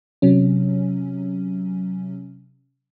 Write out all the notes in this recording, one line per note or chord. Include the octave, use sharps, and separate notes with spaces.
C3 F#3 C#4